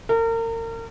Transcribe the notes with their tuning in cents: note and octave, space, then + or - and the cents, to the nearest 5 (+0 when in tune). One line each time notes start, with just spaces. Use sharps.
A#4 -35